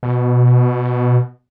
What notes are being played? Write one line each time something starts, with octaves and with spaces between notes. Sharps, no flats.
B2